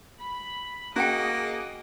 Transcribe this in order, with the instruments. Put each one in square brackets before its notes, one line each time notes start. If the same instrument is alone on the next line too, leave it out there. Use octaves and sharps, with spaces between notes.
[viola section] B5
[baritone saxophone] A#3 [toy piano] C#4 G5 [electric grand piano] F#4 D7 [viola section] G#4 D#5